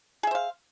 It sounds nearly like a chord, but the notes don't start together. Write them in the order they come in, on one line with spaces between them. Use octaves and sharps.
G#4 E5 C5 F5